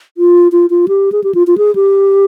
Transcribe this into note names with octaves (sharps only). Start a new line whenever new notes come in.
F4
F4
F4
G4
G#4
G4
F4
F4
G#4
G4